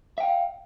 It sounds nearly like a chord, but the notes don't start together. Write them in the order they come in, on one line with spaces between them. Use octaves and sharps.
E5 G5 F5